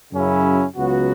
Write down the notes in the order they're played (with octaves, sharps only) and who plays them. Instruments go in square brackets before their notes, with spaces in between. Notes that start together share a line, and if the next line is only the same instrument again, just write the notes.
[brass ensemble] F#2 C#3 F#3 C#4 E4
C#2 C#3 F#3 B3 F#4